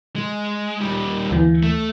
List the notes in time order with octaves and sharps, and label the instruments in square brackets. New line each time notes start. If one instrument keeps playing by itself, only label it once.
[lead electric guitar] G#3
D#2 G3
[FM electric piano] D2 E3
[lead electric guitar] A3